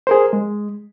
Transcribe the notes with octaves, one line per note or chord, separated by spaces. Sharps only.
G#4 A#4 C5
G#3